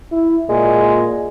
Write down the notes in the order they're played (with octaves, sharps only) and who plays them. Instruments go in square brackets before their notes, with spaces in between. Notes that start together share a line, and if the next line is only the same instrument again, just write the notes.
[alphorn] E4
[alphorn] A#2 [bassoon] G#3